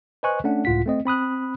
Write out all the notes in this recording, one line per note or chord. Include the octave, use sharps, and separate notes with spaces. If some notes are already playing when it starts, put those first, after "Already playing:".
B4 C5 D#5 G#5 C#6 F#6
A3 C#4 D4 F#5
C#2 A2 F4 F#5 B6
A3 C4 D#5
C4 B5 D#6 F#6